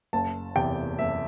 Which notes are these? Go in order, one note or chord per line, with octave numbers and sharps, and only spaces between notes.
F#1 A5
E2 C3 G5
F#1 E5